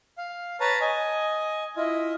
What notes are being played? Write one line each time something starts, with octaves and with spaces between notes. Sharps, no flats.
F5
B4 C#5 A5 A#5
D#5 G#5
E4 F4 D#5